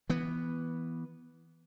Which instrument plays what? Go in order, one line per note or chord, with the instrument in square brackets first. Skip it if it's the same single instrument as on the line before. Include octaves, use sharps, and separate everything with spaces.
[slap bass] E3 B3